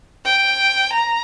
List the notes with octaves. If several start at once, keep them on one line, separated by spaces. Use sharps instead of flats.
G5
A#5